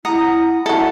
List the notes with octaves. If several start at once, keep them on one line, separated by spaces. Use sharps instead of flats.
E4 F#5 A#5 D#6
E4 F#4 A4